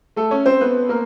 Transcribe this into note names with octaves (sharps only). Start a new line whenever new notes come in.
A3 A4
C#4 C#5
C4 C5
B3 B4
A#3 A#4